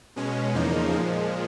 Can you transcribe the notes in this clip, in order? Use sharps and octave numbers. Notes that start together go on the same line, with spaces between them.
B2 G#3 C#4
E2 C#3 F3 A#3 D#4
A#2 F3 G#3